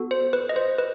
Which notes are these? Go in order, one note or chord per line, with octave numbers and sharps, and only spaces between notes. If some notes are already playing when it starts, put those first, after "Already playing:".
Already playing: B3 F#4 A4
C5
B4
D#5
C5
B4